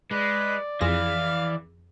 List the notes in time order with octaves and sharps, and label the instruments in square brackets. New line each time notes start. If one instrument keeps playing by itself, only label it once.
[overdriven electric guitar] G#3 [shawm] B4 [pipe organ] D5
[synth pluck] F2 G#4 A#6 [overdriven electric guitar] E3 [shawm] F5